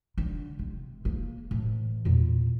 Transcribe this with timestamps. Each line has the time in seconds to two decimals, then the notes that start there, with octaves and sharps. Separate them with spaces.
0.18 D3
0.59 C3
1.05 A#3
1.51 A2 E3
2.05 E2 A#2